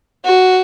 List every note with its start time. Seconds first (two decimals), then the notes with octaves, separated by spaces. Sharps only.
0.24 F#4